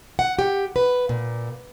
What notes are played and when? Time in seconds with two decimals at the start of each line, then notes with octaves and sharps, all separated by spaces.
0.19 F#5
0.39 G4
0.76 B4
1.09 A#2